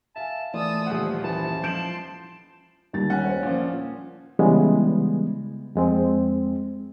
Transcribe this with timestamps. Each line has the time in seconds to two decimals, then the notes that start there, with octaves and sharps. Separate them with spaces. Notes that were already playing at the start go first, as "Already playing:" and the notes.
0.16 E5 F5 G#5 A5
0.54 E3 A3 F4 D5 A5 D#6 E6
0.87 D#1 F3 F#5
1.24 F#2 E3 A5
1.64 F3 C6 G6 D7 E7 F#7
2.93 D#2 G3 A6
3.10 C#4 F#5
3.25 C5 C#5
3.43 A#2 F3 C#4
4.39 C#3 E3 G3 G#3 B3
5.75 F2 G#3 C4